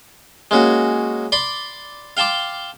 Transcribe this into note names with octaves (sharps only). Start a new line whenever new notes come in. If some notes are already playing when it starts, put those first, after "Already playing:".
G#3 A#3 C#4 F#4
D5 B5 C6 D6
F5 G5 A5 C6 D6